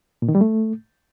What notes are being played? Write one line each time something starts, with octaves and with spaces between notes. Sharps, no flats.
A#2
D#3
G3
A3